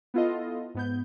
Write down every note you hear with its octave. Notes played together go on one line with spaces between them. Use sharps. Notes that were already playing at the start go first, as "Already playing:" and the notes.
B3 E4 F4 A4 D#5
G#2 B3 G6